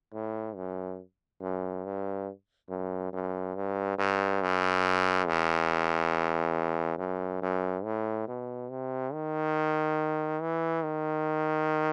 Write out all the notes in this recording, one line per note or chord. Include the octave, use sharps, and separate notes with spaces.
A2
F#2
F#2
G2
F#2
F#2
G2
G2
F#2
E2
F#2
F#2
A2
B2
C3
D#3
E3
D#3